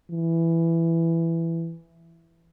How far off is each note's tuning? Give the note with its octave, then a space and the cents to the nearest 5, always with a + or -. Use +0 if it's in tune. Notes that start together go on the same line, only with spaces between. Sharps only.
E3 +10